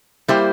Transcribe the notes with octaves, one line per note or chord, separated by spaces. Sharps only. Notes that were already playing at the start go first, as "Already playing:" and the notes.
G3 A#3 E4 G4 C5